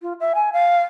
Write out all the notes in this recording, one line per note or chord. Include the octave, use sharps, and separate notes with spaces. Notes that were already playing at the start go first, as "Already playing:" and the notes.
F4
E5
G#5
F5